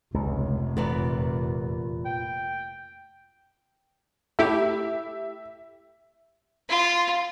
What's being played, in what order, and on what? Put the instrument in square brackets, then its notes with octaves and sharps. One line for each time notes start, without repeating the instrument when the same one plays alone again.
[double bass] F1 [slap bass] C#2
[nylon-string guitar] E2 B3 D5 [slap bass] A#2
[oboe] G5
[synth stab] A3 E4 G4 [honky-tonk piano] E5
[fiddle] F4